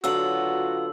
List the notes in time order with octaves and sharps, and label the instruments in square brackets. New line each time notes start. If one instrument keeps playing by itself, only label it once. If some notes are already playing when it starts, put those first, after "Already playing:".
[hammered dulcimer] D3 F#3 F#5 [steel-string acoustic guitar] B3 F4 [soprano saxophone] F#4 [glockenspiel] E6 F#7